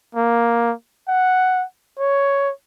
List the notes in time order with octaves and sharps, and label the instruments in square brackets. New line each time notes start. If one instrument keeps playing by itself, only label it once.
[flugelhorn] A#3
F#5
C#5